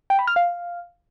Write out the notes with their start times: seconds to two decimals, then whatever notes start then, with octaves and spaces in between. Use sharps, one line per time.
0.10 G5
0.19 B5
0.27 F6
0.36 F5